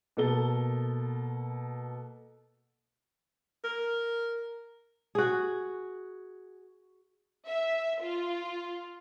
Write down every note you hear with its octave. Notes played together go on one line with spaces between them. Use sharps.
B2 A#3 A4 G7
A#4
F#4 G#4
E5
F4